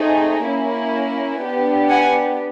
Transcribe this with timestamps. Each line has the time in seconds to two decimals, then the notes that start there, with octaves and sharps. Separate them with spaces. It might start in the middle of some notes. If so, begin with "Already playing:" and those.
Already playing: A3 C4 D#4 G#4
0.42 A#3 C#4 E4
1.40 B3 D4 G4
1.89 F#5 G#5